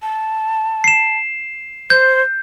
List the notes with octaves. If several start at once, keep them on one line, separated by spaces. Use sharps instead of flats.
A5
C7 E7
C5 G6